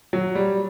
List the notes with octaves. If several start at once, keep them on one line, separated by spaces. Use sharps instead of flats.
F#3
G3